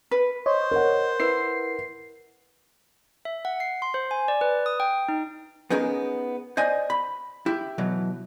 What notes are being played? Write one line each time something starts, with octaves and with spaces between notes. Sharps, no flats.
B4
C5 C#5 D#5
A#4 F#5
E4 B4 C7
E5
F#5
C7
C6
C5
G#5
D5
B4
D#6
G5
D#4
B3 C#4 D#4 G#4 A#4
C5 D5 D#5 G#5
B5
E4 G4
B2 E3 F#3